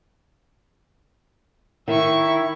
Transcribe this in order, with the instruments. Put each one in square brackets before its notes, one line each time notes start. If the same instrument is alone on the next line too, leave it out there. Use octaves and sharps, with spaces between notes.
[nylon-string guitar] D#3 [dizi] E4 [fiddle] E5 C#6